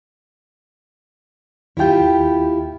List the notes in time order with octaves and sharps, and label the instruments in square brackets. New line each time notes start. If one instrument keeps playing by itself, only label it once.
[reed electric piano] D#2 G5 [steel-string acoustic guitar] E4 F4 G4